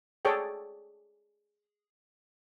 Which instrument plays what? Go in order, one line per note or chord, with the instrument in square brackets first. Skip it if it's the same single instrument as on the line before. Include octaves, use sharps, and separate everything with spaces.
[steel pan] G#4 A4 C#5 D5 G5